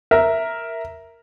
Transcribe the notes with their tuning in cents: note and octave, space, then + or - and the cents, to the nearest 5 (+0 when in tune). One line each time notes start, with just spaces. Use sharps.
A#4 +0 E5 +0